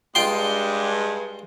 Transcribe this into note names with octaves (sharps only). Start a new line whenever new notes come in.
G2 G#3 F4 G5 C6